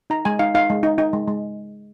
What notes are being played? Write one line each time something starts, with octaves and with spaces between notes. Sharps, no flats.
D#4 A#5
G#3 G#5
D#4 F5
D#4 F5
G#3
D#4
D#4
G#3
G#3